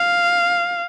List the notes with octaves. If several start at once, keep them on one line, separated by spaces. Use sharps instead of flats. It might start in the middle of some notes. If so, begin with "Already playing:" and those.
Already playing: F5